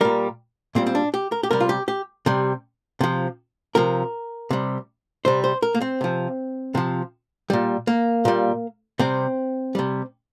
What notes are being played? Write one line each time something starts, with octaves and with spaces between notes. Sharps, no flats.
A#2 G3 A#4
A#2 G3 C4
C4
D4
G4
A#4
G4
C3 G3 A#4
F4
G4
G4
C3 G3
C3 F3
C3 F3 A#4
C3 G3
C3 G3 C5
C5
A#4
A#3
C4
C3 F3
C3 F3
A#2 G3
A#3
A#2 G3
C3 G3 C4
C3 G3